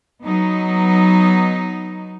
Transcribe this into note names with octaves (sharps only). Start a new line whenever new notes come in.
F#3 B3 D#4